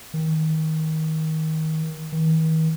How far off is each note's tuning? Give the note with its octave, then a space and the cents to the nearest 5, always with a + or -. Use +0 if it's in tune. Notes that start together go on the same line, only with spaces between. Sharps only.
D#3 +25
D#3 +45